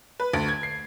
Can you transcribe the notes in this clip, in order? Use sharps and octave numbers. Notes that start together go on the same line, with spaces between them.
B4
D2
G#6
C7